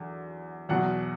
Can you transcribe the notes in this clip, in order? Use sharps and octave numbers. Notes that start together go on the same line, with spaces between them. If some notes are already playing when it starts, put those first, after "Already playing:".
Already playing: E2 D3 F#3
E2 B2 F#3 F#5